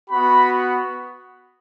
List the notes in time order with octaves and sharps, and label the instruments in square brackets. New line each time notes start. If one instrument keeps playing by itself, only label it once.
[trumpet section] B3 F#4 B5